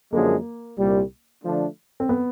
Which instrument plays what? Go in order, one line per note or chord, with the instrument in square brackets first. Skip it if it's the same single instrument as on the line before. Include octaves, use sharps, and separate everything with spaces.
[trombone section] F#2 D3 F3 G#3 [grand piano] A#3
[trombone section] C2 A#2 G3
D3 F3 A3 D4
[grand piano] C4
B3